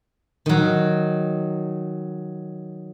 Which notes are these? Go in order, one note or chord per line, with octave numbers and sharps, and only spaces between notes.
D#3 F#3